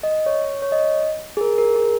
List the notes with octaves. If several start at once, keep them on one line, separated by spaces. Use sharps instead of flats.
D#5
C#5
C#5
D#5
G#4
A#4
A#4
G#4